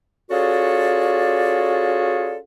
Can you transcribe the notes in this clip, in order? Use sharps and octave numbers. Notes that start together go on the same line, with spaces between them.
C#4 F4 F#4 G#4 A4 D5